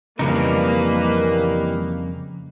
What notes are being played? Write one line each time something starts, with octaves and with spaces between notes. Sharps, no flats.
F2 C#3 E3 G3 A#3 D#4 B4